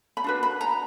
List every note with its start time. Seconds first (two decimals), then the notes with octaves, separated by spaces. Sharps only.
0.17 B5
0.24 D4 F#4 B4
0.43 B5
0.61 A#5